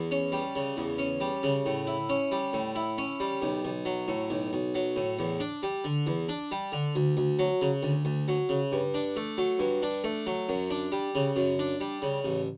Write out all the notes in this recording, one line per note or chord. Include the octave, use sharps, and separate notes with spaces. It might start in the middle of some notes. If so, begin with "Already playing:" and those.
Already playing: E2
C#4
G3
C#3
E2
C#4
G3
C#3
A2
E4
C#4
G3
A2
E4
C#4
G3
B1
B1
F#3
A2
B1
B1
F#3
A2
E2
D4
G3
D3
E2
D4
G3
D3
D2
D2
F#3
C#3
D2
D2
F#3
C#3
G2
D4
A3
F#3
G2
D4
A3
F#3
F#2
D4
G3
C#3
F#2
D4
G3
C#3
A1